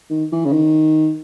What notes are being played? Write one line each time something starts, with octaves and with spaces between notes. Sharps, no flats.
D#3
E3
C#3
D#3